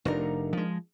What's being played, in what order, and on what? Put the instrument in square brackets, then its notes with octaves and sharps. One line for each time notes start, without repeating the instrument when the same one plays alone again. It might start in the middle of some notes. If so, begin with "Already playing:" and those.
[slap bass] F1 [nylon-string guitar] D4 D#4 A#4
[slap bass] F3 G#3